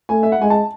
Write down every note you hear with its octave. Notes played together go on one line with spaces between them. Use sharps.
A3 G#5
E5
F#5
G#3 G#5
A5